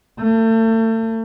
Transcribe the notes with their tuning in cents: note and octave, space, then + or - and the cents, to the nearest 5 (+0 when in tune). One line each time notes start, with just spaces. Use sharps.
A3 +35